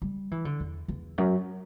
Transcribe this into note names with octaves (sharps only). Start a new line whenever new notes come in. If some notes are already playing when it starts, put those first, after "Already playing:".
G3
E3
D3
E2
E2
F#2